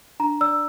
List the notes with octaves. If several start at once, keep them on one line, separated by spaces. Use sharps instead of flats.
D4 A#5
D5 E6